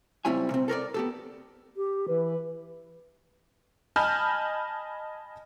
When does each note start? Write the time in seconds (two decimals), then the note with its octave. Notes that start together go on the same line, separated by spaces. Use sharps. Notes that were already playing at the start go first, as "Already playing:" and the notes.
0.25 C#2 G3 C4 E4 C#5 G#5
0.51 C3 C4
0.68 A4 A#4 C#5 D5
0.94 B3 G4 A4
1.76 G4
2.09 E3 B4
3.96 D#5 G#5 A5 B5 F6 G6